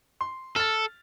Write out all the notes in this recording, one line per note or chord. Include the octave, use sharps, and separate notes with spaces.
C6
A4 F6 A6